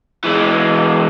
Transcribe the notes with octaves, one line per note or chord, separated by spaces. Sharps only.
E3 G#3